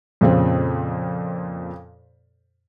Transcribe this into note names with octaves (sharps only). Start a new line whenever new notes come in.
F2 A#2 C#3 C4